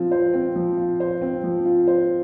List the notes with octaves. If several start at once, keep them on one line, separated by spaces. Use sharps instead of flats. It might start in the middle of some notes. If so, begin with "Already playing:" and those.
Already playing: F3 C4 F4
C5
C4
F3
F4
C5
C4
F3
F4
C5